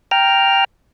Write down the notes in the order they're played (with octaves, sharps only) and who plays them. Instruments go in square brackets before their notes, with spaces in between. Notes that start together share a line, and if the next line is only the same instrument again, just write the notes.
[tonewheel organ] G5 A#5 F6